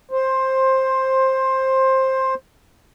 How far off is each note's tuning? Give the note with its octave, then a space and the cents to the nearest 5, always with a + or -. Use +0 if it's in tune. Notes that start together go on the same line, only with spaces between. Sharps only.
C5 +15